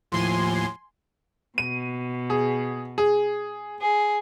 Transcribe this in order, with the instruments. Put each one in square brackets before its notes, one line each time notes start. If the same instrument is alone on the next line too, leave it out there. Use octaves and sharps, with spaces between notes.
[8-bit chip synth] D#2 A2 [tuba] F3 [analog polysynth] G#5 C6
[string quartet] B2 [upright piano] D#7
[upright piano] G#4
G#4
[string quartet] G#4